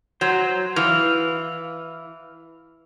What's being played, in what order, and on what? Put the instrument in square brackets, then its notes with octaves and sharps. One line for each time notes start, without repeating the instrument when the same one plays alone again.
[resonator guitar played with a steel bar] F#3 [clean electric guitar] C5
[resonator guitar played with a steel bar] E3 [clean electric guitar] F5